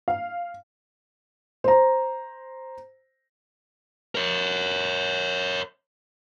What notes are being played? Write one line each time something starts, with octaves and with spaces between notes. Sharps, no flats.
F5
C5 A#5
A#4 C#5